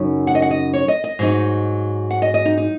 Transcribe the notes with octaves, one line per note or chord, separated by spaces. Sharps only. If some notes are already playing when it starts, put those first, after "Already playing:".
Already playing: F#2 C#3 F#3 D#4
F#5
D#5
F#5
D#5
C#5
D#5
D#5
G#2 F#3 D#4
F#5
D#5
D#5
D#4
D#4